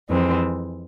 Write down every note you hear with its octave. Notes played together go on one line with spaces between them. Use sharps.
F2 E3 G#3 C4